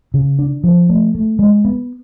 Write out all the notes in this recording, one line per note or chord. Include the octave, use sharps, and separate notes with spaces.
C#3
D4
F3
A3
A3
G#3
B3